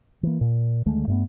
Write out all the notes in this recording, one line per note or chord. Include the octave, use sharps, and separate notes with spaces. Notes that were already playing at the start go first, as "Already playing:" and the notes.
E3 A#3
A#2
D2 D#3 G#3 A3
G2 A3 B3